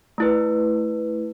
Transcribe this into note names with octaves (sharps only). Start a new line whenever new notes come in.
A3 E4 B4